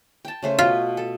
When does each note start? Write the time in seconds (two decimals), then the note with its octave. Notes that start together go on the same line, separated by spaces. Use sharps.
0.25 G5 A5
0.43 C#3 A3 C5
0.59 B2 F4 G5
0.97 A4